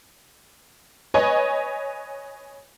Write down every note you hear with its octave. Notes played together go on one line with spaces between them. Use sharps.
B4 C#5 D#5 G#5